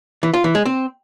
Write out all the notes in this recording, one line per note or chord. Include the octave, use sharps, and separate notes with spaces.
E3
F4
E3
G#3
C4